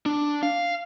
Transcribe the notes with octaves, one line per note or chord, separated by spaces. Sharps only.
D4
F5